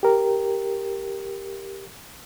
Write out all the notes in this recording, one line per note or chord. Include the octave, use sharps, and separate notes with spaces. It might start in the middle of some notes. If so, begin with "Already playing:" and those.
G4 A#4